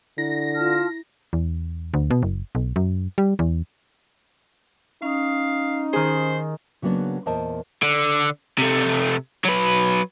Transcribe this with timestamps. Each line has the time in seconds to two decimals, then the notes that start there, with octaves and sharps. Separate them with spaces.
0.18 D3 E4 A#6
0.55 F4 A5 F6
1.33 E2
1.94 D2
2.11 B2
2.23 F#1
2.55 B1
2.76 F#2
3.18 G3
3.39 E2
5.02 C#4 D#4 F5 D#6
5.93 D#3 G#4 C5
6.82 C#3 F#3 A#3 B3 D4
7.26 E2 A#2 A#4 C5 D#5 A5
7.83 D3
8.58 C3 A3
9.45 F#3 B4